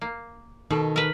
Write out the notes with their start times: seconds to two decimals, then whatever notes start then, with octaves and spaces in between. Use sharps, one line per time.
0.01 A#3
0.71 B2 D#3 A4
0.96 A#4 B4